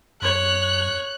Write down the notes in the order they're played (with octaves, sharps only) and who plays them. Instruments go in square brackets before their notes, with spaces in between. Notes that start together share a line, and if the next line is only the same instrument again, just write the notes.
[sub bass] F#2 [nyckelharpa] C#5 [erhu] F#6